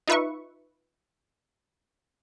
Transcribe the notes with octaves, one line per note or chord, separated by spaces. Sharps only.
D#4 F4 B4 E5 C#6